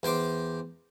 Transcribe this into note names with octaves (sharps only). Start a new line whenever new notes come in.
E2 C5 G5 C6 D6